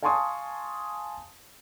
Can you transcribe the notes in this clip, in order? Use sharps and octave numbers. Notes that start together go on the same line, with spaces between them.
F5 G#5 A5 C6 C#6 D#6